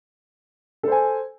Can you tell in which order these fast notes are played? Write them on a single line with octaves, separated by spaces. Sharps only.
A4 C5 G#5